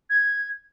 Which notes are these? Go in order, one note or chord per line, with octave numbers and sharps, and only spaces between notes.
G#6